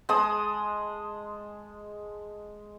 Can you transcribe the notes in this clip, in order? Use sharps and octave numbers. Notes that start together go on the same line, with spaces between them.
G#3 A5 D#6